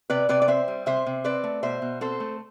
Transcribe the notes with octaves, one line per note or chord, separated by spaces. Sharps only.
C3 B4 D5
C3 B4 D5
D5
C4 C5 E5
G3
C3 C5 E5
C3
C4 B4 D5
A3
B2 C5 E5
B2
C4 A4 C5
A3